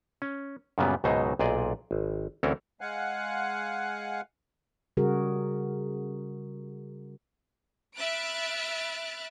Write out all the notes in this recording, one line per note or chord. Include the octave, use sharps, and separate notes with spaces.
C#4
F#2 A#2 C#3 F#3 G3 B3
C#2 G#2 B2 F#3 D#4 C5
B1 A#2 G#4 D5 D#5
G#1
D2 E3 C4 C#4 A4 A#4
G#3 F5 F#5 G#5 F#6
C#3 G3 F#4 G#4 A#4
E5 B5 F6 F#6 A6 D7